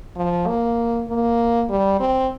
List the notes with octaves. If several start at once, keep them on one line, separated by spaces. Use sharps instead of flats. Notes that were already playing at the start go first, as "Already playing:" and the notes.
F3
A#3
A#3
G3
C4